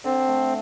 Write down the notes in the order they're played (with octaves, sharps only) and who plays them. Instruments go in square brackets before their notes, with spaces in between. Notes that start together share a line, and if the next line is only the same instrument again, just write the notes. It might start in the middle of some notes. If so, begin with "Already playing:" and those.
[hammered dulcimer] D3 [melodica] C4
[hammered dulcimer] A3